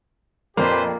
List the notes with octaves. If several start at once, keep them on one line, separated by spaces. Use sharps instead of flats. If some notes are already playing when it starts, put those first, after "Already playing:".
F1 A#1 F2 A#3 G4 B4 C5